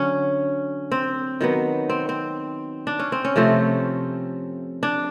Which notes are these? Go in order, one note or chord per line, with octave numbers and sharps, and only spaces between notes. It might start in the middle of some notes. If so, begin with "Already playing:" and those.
Already playing: D3 F#3 C#4
C4
D#3 F#3 B3
C4
C4
D4
C#4
C4
C#4
C3 F3 A3 C4
D4